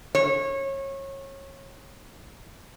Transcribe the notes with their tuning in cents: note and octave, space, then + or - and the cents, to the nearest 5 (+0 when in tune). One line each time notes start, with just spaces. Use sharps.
C#5 -25